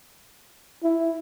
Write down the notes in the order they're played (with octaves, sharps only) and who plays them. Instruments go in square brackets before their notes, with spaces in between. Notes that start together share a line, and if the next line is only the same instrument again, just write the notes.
[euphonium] E4